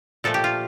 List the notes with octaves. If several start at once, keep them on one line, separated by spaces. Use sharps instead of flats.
A#2 F3 A3 A4
G4
F4